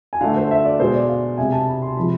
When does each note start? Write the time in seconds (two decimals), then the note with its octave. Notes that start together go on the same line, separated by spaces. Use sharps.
0.13 G#5
0.21 D3 A3 F5
0.37 C5
0.51 E5
0.65 D5
0.79 B2 G#3 C5
0.95 D5
1.09 F5
1.38 C3 G#3 G#5
1.52 A5
1.67 B5
1.82 C6
1.97 C3 F3 G#3 B5